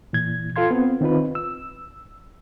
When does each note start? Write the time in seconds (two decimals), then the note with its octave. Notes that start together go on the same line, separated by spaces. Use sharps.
0.13 A#2 E3 G#6
0.56 F4 A4 F5 C6 G#6
0.71 B3 C4
1.01 D#3 C4 D#4 F4 B4
1.35 E6